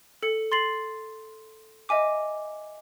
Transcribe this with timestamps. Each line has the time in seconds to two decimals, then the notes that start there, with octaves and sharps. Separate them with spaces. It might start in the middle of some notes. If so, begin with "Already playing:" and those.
0.23 A4 C#7
0.52 C6 A6 C7 F#7
1.89 D#5 E5 G#5 D6